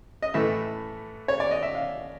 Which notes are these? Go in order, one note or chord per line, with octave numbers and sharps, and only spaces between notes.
D#5
A2 E3 A3 E5
C#5
D5
D#5
E5
F5